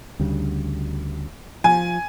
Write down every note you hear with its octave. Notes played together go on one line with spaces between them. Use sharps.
D2 C#3 G3
F3 G#5